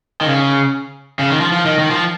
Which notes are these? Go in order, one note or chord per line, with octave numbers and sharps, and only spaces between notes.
D#3
C#3
C#3
D#3
F3
F3
D#3
D#3
F3